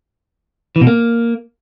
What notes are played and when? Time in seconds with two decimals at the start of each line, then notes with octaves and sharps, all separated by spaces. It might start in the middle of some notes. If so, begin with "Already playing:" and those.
0.76 E3
0.81 B2
0.87 A#3